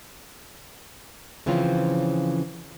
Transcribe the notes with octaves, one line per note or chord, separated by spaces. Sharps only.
C#3 E3 F3 C4 C#4 F4